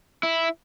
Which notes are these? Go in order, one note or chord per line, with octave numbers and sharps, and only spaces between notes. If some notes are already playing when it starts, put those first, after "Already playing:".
E4